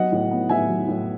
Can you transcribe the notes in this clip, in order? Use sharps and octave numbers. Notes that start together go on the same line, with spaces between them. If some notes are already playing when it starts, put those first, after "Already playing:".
Already playing: F#3 B3 D#5 F#5
A2
B3
A2 E5 G#5
F#3
A2